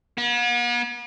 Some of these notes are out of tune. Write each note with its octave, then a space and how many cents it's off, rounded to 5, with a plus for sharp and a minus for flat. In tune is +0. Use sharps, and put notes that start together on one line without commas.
B3 -45